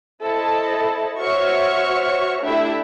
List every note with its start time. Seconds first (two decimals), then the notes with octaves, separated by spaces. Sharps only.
0.22 E4 A4 C5 D#5 A5
1.19 F#4 C5 C#5 E5 C#6 F6
2.43 A3 D4 E4 G4 E5